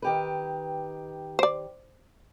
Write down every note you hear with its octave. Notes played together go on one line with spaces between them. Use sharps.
D#3 G4 B4
C5 D5